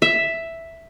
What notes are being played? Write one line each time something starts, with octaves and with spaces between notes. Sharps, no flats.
E5